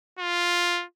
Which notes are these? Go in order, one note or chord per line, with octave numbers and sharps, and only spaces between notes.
F4